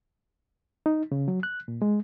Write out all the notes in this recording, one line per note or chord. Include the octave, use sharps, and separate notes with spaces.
D#4
C#3
F#3
F#6
A#2
G#3